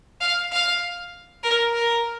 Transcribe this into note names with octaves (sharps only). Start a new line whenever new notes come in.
F5
F5
A#4
A#4